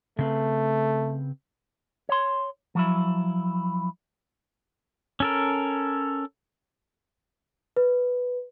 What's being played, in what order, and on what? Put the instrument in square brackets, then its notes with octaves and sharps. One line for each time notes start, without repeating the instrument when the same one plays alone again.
[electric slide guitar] C#3 C4 B4 [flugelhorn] A3
[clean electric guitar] C#5 C6
F3 F#3 E4
[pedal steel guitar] C#4 A4 A#4
[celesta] B4